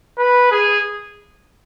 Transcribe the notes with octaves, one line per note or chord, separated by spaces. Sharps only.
B4
G#4